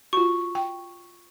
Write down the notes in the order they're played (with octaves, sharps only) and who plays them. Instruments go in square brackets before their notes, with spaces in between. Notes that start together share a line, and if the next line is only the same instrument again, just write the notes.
[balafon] F4 F#4 [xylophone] C#6
[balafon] G5